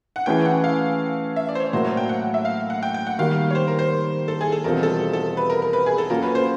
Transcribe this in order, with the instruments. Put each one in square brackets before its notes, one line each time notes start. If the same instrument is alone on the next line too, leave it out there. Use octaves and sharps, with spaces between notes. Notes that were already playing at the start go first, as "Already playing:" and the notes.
[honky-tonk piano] F#5
[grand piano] E3 A3 C#4 E4 G#4 [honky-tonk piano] G5
[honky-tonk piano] F#5
F5
E5
D5
C5
C#5
[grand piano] A2 F#3 A#3 [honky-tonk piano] C5
[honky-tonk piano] C#5
G5
F#5
E5
F5
F#5
G5
G5
F#5
[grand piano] D#3 G3 A#3 [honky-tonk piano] F5
[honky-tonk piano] C#5
C5
A#4
C5
A4
G#4
A4
[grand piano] E2 B2 G3 C4 F4 [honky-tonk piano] A#4
[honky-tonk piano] A4
A4
B4
A#4
A#4
B4
G#4
A4
[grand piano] F#3 A#3 C#4 F4 [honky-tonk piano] A#4
[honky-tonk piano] B4
C5